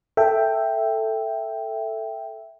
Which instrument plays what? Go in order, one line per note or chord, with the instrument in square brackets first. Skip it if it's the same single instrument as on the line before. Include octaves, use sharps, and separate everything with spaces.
[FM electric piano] A4 E5 G5